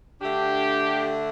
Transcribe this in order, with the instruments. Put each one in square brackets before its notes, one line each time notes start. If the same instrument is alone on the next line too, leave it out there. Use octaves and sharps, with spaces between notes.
[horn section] D3 A3 D4 G4